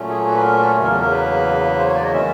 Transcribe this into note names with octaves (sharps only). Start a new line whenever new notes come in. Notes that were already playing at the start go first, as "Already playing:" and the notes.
Already playing: A#2 F#3 A3 C#4
G#4
F#4
B4
A#4
A4
E2 C#3 F#3 A#3 A#4
A#4
B4
C5
C#5
D5
D#5
D#3 G#3 C#4 E5